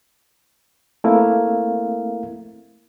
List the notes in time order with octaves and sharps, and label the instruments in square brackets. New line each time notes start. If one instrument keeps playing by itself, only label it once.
[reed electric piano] A3 A#3 C4 E4 A#4 F5